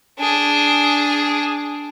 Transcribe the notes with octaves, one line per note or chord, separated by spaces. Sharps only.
D4 G#4